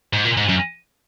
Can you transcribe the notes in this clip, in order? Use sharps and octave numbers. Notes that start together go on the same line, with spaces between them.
G#2
A#2
G#2
F#2